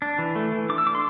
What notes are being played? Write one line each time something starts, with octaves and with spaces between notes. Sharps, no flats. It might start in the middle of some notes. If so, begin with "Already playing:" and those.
D4
E3
A3
E3
D4 D6
E6
D4 D6
C6